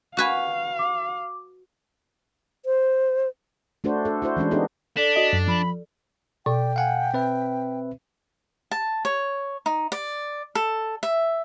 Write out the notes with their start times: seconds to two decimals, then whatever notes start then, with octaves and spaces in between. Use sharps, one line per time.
0.17 F#4 B4 F5 G#5
0.79 D6
2.66 C5
3.84 A3 D4 F#4 C5
4.05 A4
4.22 E4 F#4 C5
4.36 E3 G#3 C#4 D4
4.51 B3 D4 D#4 G4 A4
4.97 D4 A4 D5 B6
5.16 F#4 D#5
5.33 F#2
5.48 F3 B5
6.46 B2 D5 G5
6.76 F5 F#5 G#5
7.14 C4 B4 E5
8.71 A5
9.05 C#5
9.66 D#4
9.92 D5
10.55 A4
11.03 E5